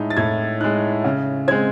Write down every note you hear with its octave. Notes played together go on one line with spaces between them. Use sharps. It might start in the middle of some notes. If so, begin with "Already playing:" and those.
Already playing: A2 G#3 D#4
A6
A2 G#6
G#3 D#4 F#6
C#3
G#3 C4 G#6